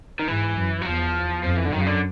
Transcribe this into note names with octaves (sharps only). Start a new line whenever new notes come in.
D#3
G#2 E3
F#2
F#3
E2 F3
F2 F3
E3
D3
F#2 D#3
C#3
D3